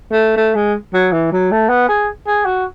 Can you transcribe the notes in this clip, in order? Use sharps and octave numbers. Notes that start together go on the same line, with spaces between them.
A3
A3
G#3
F#3
E3
F#3
A3
B3
G#4
G#4
F#4